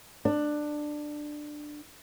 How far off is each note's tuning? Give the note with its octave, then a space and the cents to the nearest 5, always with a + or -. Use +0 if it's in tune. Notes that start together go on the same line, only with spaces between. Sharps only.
D4 +15